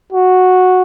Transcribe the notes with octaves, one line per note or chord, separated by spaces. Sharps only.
F#4